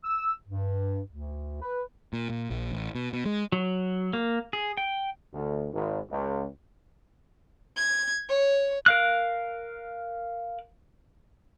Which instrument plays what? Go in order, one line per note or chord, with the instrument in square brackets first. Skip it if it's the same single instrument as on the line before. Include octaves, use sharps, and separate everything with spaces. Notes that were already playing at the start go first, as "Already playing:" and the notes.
[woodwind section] E6
G2
D2
B4
[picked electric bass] A#2
A#2
A#1
A1
B2
B2
G#3
[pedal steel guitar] F#3
A#3
G#4
G5
[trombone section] D2
G#1
C#2
[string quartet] G#6
C#5
[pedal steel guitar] A#4 F5 F#6